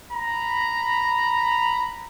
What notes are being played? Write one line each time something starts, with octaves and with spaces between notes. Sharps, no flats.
A#5 B5